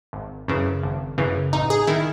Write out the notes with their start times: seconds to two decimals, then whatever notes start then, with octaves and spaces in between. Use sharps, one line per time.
0.13 G#1
0.48 F#2 C#3 E3
0.83 G#1
1.18 F#2 C#3 E3
1.53 A1 D#4
1.70 G#4
1.87 D#3 E4